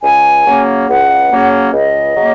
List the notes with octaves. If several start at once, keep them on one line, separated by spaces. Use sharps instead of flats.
C#2 G#5
C#3 F#3 A#3 C#4
C#2 F#5
C#3 F#3 A#3 C#4
C#2 D#5
C#3 F#3 A#3